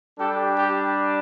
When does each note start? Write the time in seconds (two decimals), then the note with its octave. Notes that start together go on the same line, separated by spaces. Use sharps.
0.18 G3 D4 G4 A4
0.58 G4